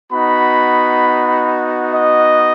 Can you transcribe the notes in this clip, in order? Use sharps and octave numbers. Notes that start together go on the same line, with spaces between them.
B3 D#4 F#4 B5
D#5